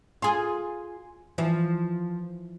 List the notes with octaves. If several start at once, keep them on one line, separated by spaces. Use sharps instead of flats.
F4 G#4 G#5 C6
E3 F3